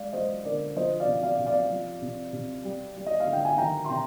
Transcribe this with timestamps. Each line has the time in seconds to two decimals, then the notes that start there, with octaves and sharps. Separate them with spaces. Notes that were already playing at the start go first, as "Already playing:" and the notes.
Already playing: G#3 D5 F5
0.13 G#3 C5 D#5
0.45 D3 A#4 D5
0.76 F3 C5 D#5
1.00 D5 F5
1.07 C3
1.23 D5 F5
1.39 C3
1.46 D5 F5
1.71 F3
2.02 C3
2.33 C3
2.64 G3
2.96 G3
3.06 D#5
3.20 F5
3.27 D3
3.33 G5
3.45 G#5
3.58 D#3 G5 A#5
3.84 C6
3.89 C3 G5 A#5